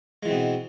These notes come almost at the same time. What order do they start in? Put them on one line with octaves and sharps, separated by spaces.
G#3 E3 C4 B2